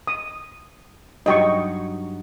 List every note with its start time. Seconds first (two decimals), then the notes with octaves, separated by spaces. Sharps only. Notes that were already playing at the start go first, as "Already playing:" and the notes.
0.07 D#6
1.26 G2 F#3 D#4 D#5 G5 C#6